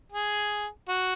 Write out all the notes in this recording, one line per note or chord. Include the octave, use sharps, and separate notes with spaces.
G#4
F#4